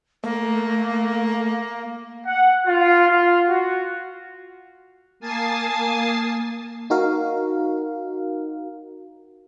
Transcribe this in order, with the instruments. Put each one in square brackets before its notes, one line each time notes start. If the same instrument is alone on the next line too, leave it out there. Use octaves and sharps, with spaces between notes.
[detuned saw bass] A3 [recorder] A#3
[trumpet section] F#5
F4
F4
F#4
[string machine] A#3 G#5 A5 D#6 A6 C7
[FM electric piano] D#4 F#4 A#4 F5